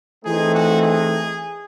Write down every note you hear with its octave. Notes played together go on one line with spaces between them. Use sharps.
E3 A3 C4 D#4 G#4
F#4
G#4